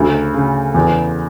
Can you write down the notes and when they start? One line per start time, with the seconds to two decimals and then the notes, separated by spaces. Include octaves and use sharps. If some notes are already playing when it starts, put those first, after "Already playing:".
Already playing: D2 C#3
0.34 C#3
0.74 E2